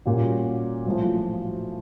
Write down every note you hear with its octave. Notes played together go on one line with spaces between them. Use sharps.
A#2 G3 A#3 C#4 F#4
B1 A2 F3